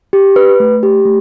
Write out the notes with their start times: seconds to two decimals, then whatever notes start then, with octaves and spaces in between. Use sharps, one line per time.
0.13 G4
0.36 B4
0.60 A3
0.83 G4
1.05 A3